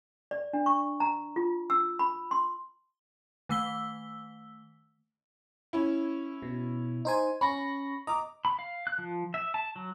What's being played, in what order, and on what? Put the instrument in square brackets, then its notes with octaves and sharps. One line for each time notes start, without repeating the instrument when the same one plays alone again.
[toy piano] D5
D4
C#6
A#5
F4
E6
B5
C6
[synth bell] D#3 A3 E6 B6 G7
[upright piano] C#4 E4
[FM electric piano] B2
D#4 C5 G#5
[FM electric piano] C#4 C#6 A#6 [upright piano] B5
[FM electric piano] D#5 [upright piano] A#5 D6
[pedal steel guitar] B5
F5
F#6
F3
E5
A5
F#3